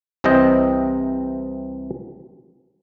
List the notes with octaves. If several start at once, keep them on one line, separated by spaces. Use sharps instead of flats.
C2 C3 E3 C4 D#5 G5